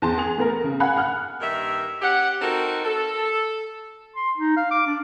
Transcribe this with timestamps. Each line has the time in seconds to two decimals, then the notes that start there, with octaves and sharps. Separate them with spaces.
0.02 E2 A5 C6
0.18 G#4 F7
0.38 A3 B3 A#4
0.64 C#3
0.80 F5 F#5 G#5 B5 F#6
0.96 F#5 F6 F#6
1.41 G2 D#3 A#3 A#4 E5
2.02 C#4 G4 F#5
2.41 C4 D#4 F#4 A4 A#4
2.85 A4
4.16 C6
4.37 D#4
4.56 F5
4.71 D6
4.87 D4